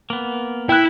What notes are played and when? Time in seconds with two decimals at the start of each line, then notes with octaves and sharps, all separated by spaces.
0.10 A#3 B3
0.69 E4 G5 F#6